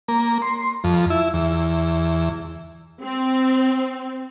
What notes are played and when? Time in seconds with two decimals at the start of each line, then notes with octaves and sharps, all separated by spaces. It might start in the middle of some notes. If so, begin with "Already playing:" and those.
0.08 A#3
0.42 C6
0.84 F2
1.10 E4
1.34 E2
3.02 C4